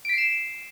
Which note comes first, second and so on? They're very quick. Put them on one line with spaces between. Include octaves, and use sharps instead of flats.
D7 B6 C7 E7